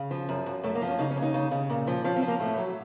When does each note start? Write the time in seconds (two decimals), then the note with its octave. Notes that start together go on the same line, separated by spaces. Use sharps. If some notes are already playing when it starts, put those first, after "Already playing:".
Already playing: C#3
0.11 F3
0.29 F#2
0.46 F#2
0.63 F#2 A3
0.75 A#3
0.82 F3
0.87 C#4
0.99 C#3 D#4
1.11 C#4
1.17 D#2
1.22 D#4
1.34 C#3
1.51 C#3
1.70 A#2
1.87 F3
2.04 F3 C#4
2.16 C4
2.22 F3
2.28 A#3
2.40 A2 A3
2.58 F#3